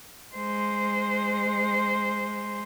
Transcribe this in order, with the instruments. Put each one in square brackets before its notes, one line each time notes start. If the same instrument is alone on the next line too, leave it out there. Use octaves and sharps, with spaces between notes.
[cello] G#3 C5